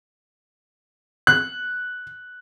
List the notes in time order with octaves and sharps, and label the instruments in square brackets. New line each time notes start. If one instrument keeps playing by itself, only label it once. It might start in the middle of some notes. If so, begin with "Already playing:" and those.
[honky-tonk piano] F#6